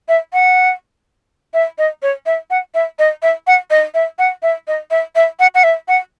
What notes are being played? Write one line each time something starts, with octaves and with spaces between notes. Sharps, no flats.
E5
F#5
E5
D#5
C#5
E5
F#5
E5
D#5
E5
F#5
D#5
E5
F#5
E5
D#5
E5
E5
F#5
F#5
E5
F#5